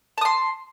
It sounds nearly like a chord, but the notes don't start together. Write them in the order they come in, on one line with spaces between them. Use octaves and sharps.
A5 D#6 C6